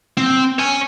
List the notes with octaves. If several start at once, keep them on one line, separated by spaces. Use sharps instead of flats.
C4
C#5 G#5